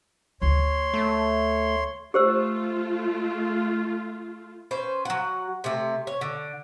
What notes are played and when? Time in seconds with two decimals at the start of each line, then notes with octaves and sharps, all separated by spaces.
0.42 D2 C#5 C6
0.93 A3
2.14 A3 F4 G4 C5 E6
4.71 C#4 B4 C5
5.05 F#3 F#5
5.64 C3 A3
6.07 C#5
6.21 D3